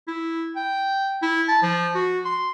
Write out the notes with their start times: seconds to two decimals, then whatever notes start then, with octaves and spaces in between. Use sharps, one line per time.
0.08 E4
0.56 G5
1.22 E4
1.48 A5
1.63 F3
1.95 F#4
2.25 C6